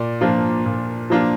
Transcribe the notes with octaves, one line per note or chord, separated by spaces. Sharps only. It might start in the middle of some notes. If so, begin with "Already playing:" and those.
Already playing: A#2 D5
F3 A#3 D4 F4
A#2
F3 A#3 D4 F4